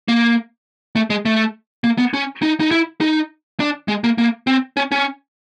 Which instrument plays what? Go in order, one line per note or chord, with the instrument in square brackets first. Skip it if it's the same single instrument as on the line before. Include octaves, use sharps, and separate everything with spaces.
[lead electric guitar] A#3
A3
G#3
A3
A#3
B3
C#4
D#4
D#4
E4
D#4
D4
G#3
A#3
A#3
C4
C#4
C#4